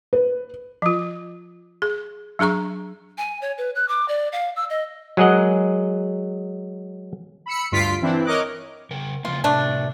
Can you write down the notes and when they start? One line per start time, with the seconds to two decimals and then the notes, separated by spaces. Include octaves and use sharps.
0.13 B4
0.82 F3 F4
1.82 G#4
2.39 F#3 D4 G#4 A#5 C#6
3.18 G#5
3.42 C#5
3.58 B4
3.75 F#6
3.88 D6
4.08 D5
4.32 F5
4.56 E6
4.70 D#5
5.17 F#3 G#3 G#4 A#4 D#5 F#5
7.46 B5 E6 C#7
7.72 D2 G2 F4 B6 C7 D7
8.02 E3 C4 D4 E4
8.24 A#4 C#5 D#5 D6 F#6
8.91 C#3 A#4
9.25 C#3 F3 A#3 F4
9.44 A2 C3 A3 D4